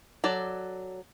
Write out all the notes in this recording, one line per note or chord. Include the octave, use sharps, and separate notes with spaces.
F#3 A4 D5